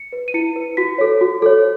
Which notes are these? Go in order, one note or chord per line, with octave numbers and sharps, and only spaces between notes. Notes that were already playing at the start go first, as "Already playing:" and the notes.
Already playing: C#7
B4
D#7
E4 C#7
B4
F#4 B6
A4 C#5
F#4
A4 C#5